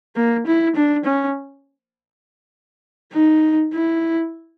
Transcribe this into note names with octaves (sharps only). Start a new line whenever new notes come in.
A#3
E4
D4
C#4
D#4
E4